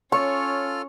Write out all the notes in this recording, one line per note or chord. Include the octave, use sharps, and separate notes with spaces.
C#4 F4 A4 C#5 C#6 F6